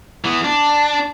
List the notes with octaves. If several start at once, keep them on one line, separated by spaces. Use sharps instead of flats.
E3 B3
D4